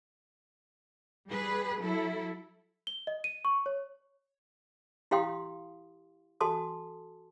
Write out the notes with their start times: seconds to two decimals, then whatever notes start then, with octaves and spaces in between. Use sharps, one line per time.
1.29 G3 G#4 B4
1.80 F#3 E4 A4
2.87 G7
3.07 D#5
3.24 D#7
3.45 C#6
3.66 C#5
5.11 E4 G4 F5 G5 C6 D#6
6.41 F#4 A4 G#5 A5 C6 D#6